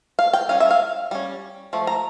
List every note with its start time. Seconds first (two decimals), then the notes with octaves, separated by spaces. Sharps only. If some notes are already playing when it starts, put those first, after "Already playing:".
0.19 F5
0.33 G5
0.49 G3 C#4 F5
0.60 E5
0.71 F5
1.11 G3 C#4
1.73 F3 A3
1.87 A#5